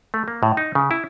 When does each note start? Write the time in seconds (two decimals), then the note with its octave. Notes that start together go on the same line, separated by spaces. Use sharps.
0.14 A3
0.28 A#3
0.43 A2
0.57 D#4
0.75 C#3
0.91 E4